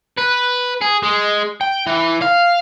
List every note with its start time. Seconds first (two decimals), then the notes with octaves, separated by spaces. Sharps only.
0.18 B4
0.82 G#4
1.03 G#3
1.61 G5
1.86 E3
2.22 F5